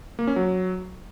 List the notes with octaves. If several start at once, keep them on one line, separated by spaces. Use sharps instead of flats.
A#3
C#4
F#3